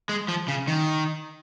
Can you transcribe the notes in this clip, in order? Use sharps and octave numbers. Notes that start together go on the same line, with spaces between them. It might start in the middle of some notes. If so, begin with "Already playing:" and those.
G#3
F3
C#3
D#3